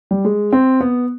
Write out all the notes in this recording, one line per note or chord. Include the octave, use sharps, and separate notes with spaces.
G3
G#3
C4
B3